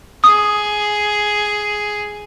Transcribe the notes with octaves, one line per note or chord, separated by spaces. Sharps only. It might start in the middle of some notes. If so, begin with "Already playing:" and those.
G#4 D#6